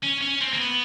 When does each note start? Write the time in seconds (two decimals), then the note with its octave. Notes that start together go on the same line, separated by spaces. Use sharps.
0.03 C#4
0.22 C#4
0.41 C4
0.53 A#3
0.59 B3